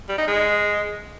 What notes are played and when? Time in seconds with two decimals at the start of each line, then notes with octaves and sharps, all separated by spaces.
0.09 G3
0.18 D#4
0.27 G#3